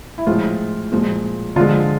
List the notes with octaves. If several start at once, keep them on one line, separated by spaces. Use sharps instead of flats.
E4
A2 F3 G#3 F4
A#2 F3 G#3
D3 F3 G#3 F4